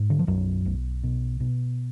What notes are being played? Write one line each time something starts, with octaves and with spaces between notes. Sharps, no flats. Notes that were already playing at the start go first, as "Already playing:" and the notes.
Already playing: G#2
D3
F3
B1 F#2 F#3
B1
B2
B2